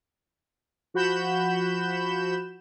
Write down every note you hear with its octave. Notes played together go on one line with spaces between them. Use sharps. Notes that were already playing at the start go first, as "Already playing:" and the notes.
F3 F#4 F#5 B5 G6 E7